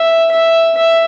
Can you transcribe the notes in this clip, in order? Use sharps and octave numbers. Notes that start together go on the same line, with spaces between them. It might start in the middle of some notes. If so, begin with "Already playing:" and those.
Already playing: E5
E5
E5